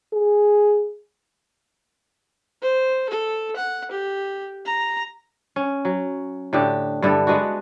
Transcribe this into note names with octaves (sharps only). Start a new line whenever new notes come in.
G#4
C5
A4
F#5
G4
A#5
C#4
F#3
A2 D3 G4
G2 D3 E4 A4
G#3 B3 D4 F#4